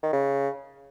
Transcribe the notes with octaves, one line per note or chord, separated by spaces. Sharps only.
D#3
C#3